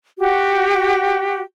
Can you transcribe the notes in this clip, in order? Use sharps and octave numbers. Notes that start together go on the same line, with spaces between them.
F#4 G4